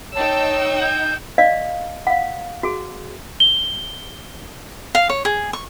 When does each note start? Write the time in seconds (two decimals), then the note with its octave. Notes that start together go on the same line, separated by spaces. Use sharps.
0.15 D#4 C#5 G5 A5 E6
0.81 G6
1.38 D5 D#5 F5
2.07 F5 F#5
2.63 F#4 G#4
3.40 G7
4.95 F5
5.10 C#5
5.25 G#4
5.53 C#6